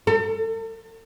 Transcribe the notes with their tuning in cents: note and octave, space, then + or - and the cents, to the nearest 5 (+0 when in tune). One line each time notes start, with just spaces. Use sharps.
A4 +40